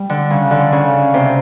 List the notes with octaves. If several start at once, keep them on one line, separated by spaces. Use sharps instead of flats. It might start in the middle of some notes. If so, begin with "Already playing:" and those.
Already playing: G3
D3
C#3
D3
C#3
C3